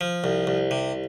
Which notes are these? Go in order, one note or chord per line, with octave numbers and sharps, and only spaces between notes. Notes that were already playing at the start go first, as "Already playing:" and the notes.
F3
C2
C2
C3